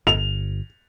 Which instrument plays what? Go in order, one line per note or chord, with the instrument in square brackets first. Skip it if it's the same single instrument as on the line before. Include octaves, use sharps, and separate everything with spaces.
[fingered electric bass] G1 [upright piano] F7